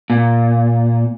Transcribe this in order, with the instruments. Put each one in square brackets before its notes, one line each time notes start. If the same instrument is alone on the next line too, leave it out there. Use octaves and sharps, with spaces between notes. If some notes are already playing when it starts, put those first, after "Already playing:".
[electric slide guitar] A#2